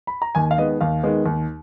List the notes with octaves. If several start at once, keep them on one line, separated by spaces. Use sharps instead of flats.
B5
A#5
D#2 G#5
F5
D#3 G#3 B3 D#5
D#2 F5
D#3 G#3 B3
D#2